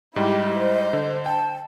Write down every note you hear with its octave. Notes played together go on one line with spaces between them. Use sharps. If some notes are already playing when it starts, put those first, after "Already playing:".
G#2 G3 E4 G4 D#5
C5
D3
G5 A5